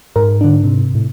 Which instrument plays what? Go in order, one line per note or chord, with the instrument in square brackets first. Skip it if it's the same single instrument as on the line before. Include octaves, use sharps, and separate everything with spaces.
[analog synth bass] G#2 [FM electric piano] A#4
[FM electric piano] D3 D4
C3
[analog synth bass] A2